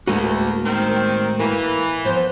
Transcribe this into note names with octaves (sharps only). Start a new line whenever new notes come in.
D2 A2 G#3 A#3 F#4 B4
D#3 C4
E3 A#3
F3 B3 C5